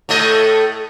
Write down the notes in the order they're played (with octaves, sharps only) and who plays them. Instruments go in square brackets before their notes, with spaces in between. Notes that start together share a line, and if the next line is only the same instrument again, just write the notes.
[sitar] A2 A3 D#5